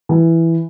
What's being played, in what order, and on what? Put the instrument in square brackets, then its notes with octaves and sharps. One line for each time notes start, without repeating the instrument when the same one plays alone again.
[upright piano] E3